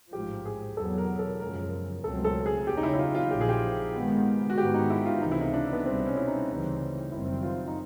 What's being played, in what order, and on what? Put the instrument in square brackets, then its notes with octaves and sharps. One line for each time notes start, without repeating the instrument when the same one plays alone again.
[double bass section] A1 G#2 F3 [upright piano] G4
[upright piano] G#4
[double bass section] E2 B2 F#3 B3 [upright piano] A4
[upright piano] A#4
A4
[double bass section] F#2 C#3 F3 G#3 [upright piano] A#4
[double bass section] C#2 B2 F#3 A3 C4 [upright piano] A4
[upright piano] A4
G#4
[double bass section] E2 C#3 F#3 [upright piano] G4
[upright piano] D#4
E4
E4
F4
F4
[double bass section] A#1 A#2 F3 [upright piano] G4
[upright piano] G#4
G4
[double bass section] G#2 D#3 G#3 B3
[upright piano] F#4
[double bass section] G#2 D#3 G#3 B3 [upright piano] G4
[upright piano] D#4
E4
F4
[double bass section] C#2 C3 E3 A3 [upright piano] D#4
[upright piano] E4
D#4
D4
B3
[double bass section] C2 B2 G3 [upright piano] C4
[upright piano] C#4
E4
D#4
[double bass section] D2 C#3 E3 G3 C4
[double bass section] F#1 F#2 D#3 G3 C4 [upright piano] E4
[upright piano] F4
D#4